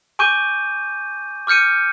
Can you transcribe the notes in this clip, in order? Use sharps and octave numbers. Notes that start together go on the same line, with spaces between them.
G#5 C#6 D6 G6 D#7
D6 F6 G6 C#7 D#7